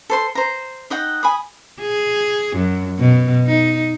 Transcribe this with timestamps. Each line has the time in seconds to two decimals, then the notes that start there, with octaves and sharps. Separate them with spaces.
0.10 A4 C5 C6
0.35 C5 A#5
0.90 D#4 D#5 F#5 G5
1.23 G#5 B5 D#6
1.81 G#4
2.57 F#2
3.00 B2
3.46 D#4